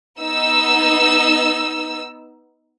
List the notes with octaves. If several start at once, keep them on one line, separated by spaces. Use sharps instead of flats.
B3 D#4 E6